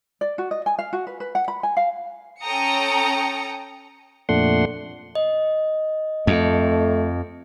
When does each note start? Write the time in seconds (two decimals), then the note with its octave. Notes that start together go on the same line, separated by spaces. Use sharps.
0.21 D5
0.38 F#4
0.51 D#5
0.66 G#5
0.79 F5
0.93 F#4
1.07 B4
1.20 B4
1.35 F#5
1.48 B5
1.63 G#5
1.77 F5
2.42 C#4 A4 G5 A#5 D#6 C#7
4.29 F2 A#2 A3 D4 F#5 C6
5.15 D#5
6.27 F2 A3